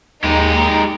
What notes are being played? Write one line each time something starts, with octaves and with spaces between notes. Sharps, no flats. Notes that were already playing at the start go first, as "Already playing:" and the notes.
D#2 G#3 D#4 G4